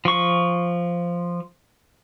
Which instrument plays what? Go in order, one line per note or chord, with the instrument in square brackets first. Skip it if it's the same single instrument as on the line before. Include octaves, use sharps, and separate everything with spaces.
[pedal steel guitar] F3 C#6